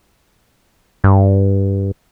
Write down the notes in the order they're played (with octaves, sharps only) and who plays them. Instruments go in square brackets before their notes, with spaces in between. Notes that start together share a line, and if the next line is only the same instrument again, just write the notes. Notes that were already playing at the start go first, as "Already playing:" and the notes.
[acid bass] G2